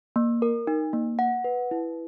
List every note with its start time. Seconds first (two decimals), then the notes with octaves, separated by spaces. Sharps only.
0.16 A#3
0.42 A#4
0.67 D#4
0.93 A#3
1.19 F#5
1.44 B4
1.71 E4